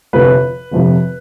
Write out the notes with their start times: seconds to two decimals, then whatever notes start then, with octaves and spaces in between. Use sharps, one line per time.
0.13 G1 F2 C3 F3 B4
0.71 G1 F2 C3 F3